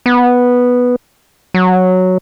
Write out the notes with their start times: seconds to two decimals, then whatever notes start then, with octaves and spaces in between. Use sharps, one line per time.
0.06 B3
1.54 F#3